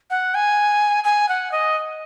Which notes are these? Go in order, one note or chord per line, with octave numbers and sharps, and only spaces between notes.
F#5
G#5
G#5
F#5
D#5